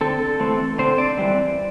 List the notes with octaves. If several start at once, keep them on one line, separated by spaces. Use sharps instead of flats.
D3 C4 A4
E3 A3 C4
D3 C4 C5
D5
E3 G3 C4